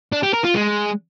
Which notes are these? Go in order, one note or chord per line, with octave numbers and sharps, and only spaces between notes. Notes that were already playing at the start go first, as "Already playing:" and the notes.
D4
G4
A#4
F4
G#3